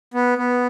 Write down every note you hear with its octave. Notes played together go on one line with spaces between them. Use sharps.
B3
B3